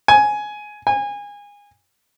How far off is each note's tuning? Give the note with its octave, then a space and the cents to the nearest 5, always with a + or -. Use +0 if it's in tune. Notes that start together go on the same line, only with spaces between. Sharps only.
G#5 +10
G#5 -25